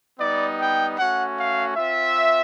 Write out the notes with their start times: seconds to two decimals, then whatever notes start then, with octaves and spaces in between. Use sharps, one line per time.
0.19 G3 B3 D#4 D5
0.59 G5
0.98 A3 C#4 F#4 F#5
1.38 F5
1.76 C4 F4 E5